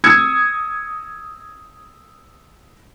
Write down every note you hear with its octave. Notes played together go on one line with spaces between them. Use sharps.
D#6 E6 G#6 C#7